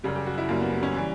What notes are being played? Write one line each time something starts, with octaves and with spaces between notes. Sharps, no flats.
F#2 C#3 G3
G4
F#4
E4
F#2 C#3 G3 A#3
B3
B3
C#4
E3 G3